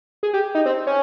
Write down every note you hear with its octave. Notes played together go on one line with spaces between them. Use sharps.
G#4
G4
D#4
C4
C#4